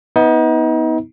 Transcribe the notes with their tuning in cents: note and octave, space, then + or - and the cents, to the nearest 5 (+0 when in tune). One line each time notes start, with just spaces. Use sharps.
B3 +0 D#4 +35